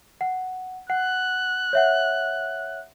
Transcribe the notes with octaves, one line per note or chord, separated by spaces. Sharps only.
F#5
F#5 F#6
C#5 E5 F#5